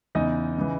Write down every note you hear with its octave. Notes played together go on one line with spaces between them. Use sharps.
E2 C#3 E3 D#4 D#5
C#3 E3